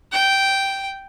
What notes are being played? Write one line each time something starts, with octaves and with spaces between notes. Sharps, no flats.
G5